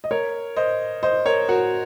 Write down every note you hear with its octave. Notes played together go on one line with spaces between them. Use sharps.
D#5
A#4 C#5
C5 D#5
C5 D#5
A#4 C#5
F#4 A#4